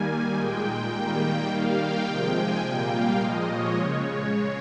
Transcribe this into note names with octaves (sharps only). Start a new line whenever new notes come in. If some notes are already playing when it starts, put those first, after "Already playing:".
Already playing: D#3 G3 A#3 G#5
A#2 G#3 G5
D#3 G3 A#3
D#3 G3 A#3 F5
G5
C3 F3 G#3 G5
G#5
A#2 G3 A#3 G5
F5
A#2 F3 G#3 D#5
C#5
C#3 G#3